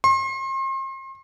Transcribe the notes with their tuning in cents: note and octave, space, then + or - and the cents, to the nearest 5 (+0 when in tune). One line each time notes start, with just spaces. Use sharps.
C6 +40